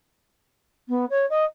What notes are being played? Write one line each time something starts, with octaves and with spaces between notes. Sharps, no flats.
B3
C#5
D#5